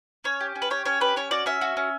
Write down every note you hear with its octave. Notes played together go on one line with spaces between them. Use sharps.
C#4 C#5
G4
C#4
B4
G4 C#5
C#4 C#5
G4 B4
C#4 C#5
F#4 D5
C#4 E5
F#4
C#4